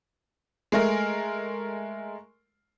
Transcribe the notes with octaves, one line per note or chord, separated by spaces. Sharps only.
G#3 A3 A#4